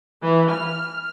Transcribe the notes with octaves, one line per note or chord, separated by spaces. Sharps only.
E3
F6